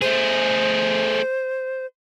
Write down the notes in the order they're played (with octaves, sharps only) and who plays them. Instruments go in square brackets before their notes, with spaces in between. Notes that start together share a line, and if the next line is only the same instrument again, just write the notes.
[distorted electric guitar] A3 G#4 [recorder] C5